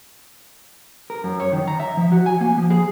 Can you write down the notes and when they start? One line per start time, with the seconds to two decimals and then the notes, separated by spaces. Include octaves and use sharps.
1.10 A#4
1.24 F#2
1.40 C#5
1.52 D#3
1.67 A#5
1.80 E5
1.97 F3
2.12 F#4
2.26 G#5
2.41 A#3
2.58 F3
2.70 G#4